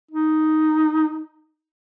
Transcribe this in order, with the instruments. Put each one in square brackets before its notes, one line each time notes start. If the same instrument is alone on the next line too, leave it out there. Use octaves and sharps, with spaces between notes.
[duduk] D#4